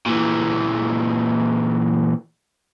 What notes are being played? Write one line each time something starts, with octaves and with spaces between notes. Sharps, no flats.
A#2 E3